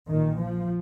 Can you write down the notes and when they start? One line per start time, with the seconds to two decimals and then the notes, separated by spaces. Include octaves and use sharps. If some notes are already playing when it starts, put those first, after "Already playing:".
0.10 A#1 A#2 D#3
0.40 F3